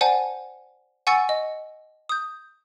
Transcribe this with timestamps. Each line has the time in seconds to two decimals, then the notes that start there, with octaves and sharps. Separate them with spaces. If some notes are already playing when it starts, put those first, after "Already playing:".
0.01 C5 D5 F#5 G#5 A5
1.07 F#5 G#5 C#6 E6 A6 C#7
1.29 D#5
2.09 D#6 G6